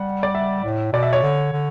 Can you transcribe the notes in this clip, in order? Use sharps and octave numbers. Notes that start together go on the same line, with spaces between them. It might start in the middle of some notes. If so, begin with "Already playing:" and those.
Already playing: G3 F#5
D5
E5
A2
B2 D5
E5
C#5
D3
D3